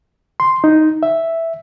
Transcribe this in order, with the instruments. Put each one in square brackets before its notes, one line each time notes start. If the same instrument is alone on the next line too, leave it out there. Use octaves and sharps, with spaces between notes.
[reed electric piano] C6
D#4
E5